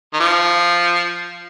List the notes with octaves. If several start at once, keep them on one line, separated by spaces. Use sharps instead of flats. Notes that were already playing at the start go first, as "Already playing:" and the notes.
D#3
F3